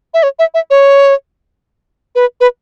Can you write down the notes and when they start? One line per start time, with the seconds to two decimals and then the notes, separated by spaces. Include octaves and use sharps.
0.14 E5
0.23 C#5
0.39 E5
0.54 E5
0.70 C#5
2.15 B4
2.41 B4